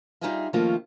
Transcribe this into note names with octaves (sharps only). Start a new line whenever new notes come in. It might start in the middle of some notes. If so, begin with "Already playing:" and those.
G3 D#4 F4 G#4 E5 F5
D#3 F3 A3 A#3 C#4 F4